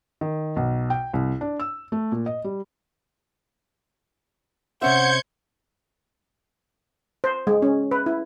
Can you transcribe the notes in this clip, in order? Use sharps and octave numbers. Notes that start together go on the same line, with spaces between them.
D#3
B1
G5
C2
D4
E6
A3
A#2
D#5
G3
C3 C#4 C5 E5 F#5 G6 G#6 C#7
C5
G#3
C#4
B4
E4